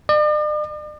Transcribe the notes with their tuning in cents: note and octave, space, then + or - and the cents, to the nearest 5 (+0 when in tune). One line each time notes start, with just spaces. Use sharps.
D5 +45